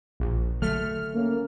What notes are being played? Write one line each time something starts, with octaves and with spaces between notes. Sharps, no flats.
A#1
D3 F#3 A3 F6
A#3 C#4